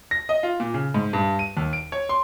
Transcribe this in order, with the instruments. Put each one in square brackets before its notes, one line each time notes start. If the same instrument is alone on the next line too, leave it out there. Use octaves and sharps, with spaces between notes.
[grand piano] A#6
D#5
F4
A#2
C#3
G#2
G2
D#7
D#2
D7
C#5
C6